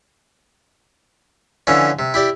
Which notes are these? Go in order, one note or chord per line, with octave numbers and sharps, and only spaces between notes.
D3 E3 F3 C#4
C3
E4 G4 D5